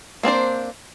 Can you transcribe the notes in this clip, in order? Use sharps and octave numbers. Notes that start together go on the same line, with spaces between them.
A#3 C4 D4 C5